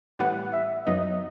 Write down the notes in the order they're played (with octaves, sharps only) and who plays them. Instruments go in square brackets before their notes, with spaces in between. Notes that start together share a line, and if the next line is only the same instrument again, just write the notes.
[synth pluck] A2 E3 G3 B3 [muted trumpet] F#5
[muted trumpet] E5
[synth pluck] F#2 F#3 B3 D#4 [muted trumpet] D#5